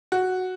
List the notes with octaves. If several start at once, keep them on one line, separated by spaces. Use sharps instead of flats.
F#4